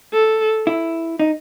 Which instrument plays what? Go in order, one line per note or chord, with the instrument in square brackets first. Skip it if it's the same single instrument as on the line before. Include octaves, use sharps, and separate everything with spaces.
[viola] A4
[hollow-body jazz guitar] E4
D#4